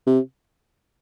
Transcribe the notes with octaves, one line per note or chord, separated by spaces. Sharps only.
C3